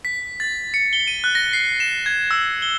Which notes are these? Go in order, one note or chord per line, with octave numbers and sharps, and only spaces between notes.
B6
A6
C#7
G7
D#7
F#6
A#6
C7
E7
G#6
E6
G7